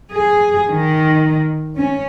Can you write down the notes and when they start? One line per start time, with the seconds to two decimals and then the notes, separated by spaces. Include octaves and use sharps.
0.11 G#4
0.69 D#3
1.76 C#4